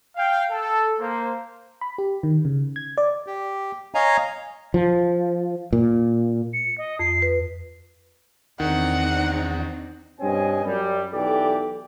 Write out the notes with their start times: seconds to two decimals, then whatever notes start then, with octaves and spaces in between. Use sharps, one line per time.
0.17 F5 G5
0.51 A4
1.00 A#3 C5
1.81 B5
1.98 G4
2.23 D#3
2.45 C#3
2.76 G#6
2.98 D5
3.27 G4
3.95 C#5 D#5 F5 G#5 A#5
4.74 F3
5.73 A#2
6.53 C#7
6.78 D#5
6.99 F2 C7
7.22 B4
8.60 E2 D#3 C4 D4 D#4 F#5
10.21 G2 B2 C4 C#4 D#5 G#5
10.64 F#2 G3
11.13 B1 E3 G4 A4 D5